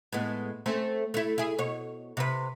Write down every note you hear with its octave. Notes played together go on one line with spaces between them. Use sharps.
A2 G#3 B3
A3 C4 C#4
A3 E4
E4 G#4
B2 C#5
C3 B4